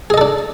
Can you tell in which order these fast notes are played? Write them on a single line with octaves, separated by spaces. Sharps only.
G#4 D#5 A4 D4